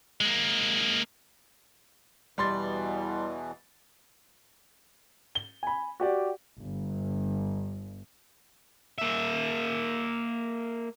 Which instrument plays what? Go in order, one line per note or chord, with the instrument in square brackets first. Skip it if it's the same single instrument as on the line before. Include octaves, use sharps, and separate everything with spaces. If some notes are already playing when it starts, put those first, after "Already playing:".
[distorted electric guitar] G#3 A#3
[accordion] E2 B2 E3 [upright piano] G3 C6 A6
[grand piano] G7
G#5 B5
F#4 G4 D5
[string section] G1
[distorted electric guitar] A#3 E5